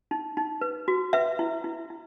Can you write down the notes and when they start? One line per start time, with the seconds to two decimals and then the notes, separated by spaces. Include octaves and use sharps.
0.11 D#4
0.37 D#4
0.61 B4
0.88 F#4
1.13 B4 E5
1.39 E4
1.64 E4
1.90 E4